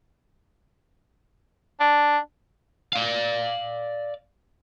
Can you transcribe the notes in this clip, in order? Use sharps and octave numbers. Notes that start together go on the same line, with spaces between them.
D4
D5 F5